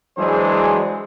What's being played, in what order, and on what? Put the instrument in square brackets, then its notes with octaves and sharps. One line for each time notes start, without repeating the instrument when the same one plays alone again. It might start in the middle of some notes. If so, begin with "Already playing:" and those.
[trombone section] E3 F#3 G#3 D4 G#4 C5